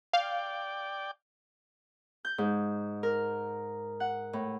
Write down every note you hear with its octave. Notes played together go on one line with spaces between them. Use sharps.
D5 F5 G5
G6
G#2
A#4
F#5
A2